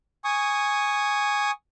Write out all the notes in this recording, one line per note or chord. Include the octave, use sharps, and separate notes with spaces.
G#5 C#6 D#6